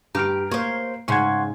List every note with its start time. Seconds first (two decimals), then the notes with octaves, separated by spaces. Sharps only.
0.15 G2 G4 A#5 F6 D7
0.51 A#3 C5 C#5
1.08 G#2 C#3 F#5 G#5 C6 C#6 G#6